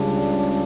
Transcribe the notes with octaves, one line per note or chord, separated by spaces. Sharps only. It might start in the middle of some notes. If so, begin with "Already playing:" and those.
Already playing: C#2 C#3 G3 D4